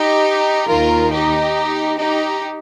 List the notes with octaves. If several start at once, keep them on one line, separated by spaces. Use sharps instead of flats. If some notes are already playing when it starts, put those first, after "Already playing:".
Already playing: D#4 G4
D#2 D#3 F4 A#4
D#4 G4
D#4 G4